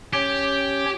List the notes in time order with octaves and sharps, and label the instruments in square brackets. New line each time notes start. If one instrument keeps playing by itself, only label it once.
[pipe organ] C#4 C#5 [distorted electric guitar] G4